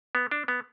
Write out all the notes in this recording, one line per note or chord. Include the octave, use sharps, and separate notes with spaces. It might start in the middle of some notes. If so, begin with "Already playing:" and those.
B3
D4
B3